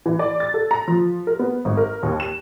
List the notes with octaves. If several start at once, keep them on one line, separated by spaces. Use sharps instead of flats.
E3
D5
A6
A4
A#5
F3
A#4
B3
G#1
A#4
D#2
E7